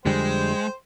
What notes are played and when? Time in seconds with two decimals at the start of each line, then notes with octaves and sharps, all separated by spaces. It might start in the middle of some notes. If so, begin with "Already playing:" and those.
0.06 F2 D3 G3 G#3 C5 G5